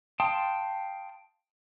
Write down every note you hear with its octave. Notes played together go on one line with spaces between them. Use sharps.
F5 G5 A5 C6 D#6